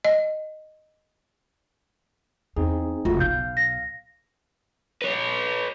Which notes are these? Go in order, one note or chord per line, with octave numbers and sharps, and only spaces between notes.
D#5
E2 C4 D#4 G#4
F1 C#3 G#3 A3 F4 F#4
B1 B2 F5 G6
A#6
B4 C#5